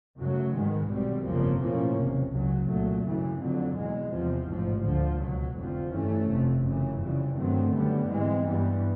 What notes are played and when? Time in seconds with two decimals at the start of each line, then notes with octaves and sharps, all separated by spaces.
0.17 F#2 C#3 F#3 A3
0.53 G#2 D#3 G#3 B3
0.89 B1 B2 G3 C4
1.25 G1 F2 C#3 F3 A#3
1.61 B1 A2 F3 A#3 C#4
1.97 F#1 E2 C3
2.33 C#2 C#3 F#3
2.69 C2 A#2 F#3 A3
3.05 F#2 C#3 E3
3.41 F2 D3 F#3
3.78 E2 B2 G#3
4.13 E2 C3 F3
4.50 A1 G#2 F3
4.85 D2 D3 F3
5.21 C#2 B2 F#3
5.57 F1 F2 D3 F3
5.93 G2 E3 A3 C#4
6.29 F1 F2 C3
6.65 F#2 C#3 E3
7.01 F2 C#3 E3 G3
7.37 G2 D#3 F#3 A3 C4
7.73 F#2 D3 G3 B3
8.09 G#2 E3 G#3 C4
8.45 G2 E3 G3 B3